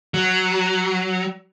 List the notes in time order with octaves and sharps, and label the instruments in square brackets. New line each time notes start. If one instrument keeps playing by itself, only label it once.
[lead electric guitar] F#3